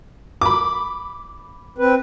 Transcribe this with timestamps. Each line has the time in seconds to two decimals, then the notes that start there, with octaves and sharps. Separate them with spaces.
0.41 B5 D6
1.78 C4 B4